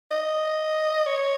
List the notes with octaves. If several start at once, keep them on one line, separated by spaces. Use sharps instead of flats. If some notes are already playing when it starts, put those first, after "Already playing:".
D#5
C#5